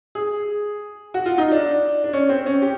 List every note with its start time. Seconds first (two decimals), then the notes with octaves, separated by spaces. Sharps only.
0.15 G#4
1.14 F#4
1.26 F4
1.38 D#4
1.52 D4
2.04 D4
2.13 C#4
2.29 C4
2.46 C#4
2.62 G4